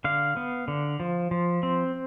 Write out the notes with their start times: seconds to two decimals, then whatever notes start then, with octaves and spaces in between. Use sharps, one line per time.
0.04 D3 F5
0.37 B3
0.68 D3
1.00 F3
1.31 F3
1.63 C4